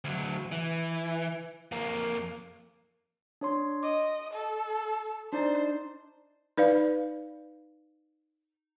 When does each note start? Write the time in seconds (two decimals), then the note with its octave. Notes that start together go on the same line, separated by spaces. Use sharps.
0.04 D2 F#3
0.52 E3
1.72 F2 A#3
3.41 D4 C#5 C6
3.83 D#5 D6
4.33 A4
5.33 D4 D#4 C5 D5
6.57 D#4 B4 D5 F5